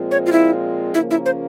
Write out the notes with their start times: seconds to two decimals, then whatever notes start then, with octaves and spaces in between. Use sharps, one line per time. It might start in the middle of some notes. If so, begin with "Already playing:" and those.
Already playing: A#2 F3 G#3 C4
0.11 C#5
0.26 F4
0.32 E4
0.94 C#3 F3 A#3 C#4 E4
1.11 E4
1.26 C5